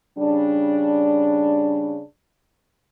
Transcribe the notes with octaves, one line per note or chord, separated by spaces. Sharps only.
C#3 G3 D4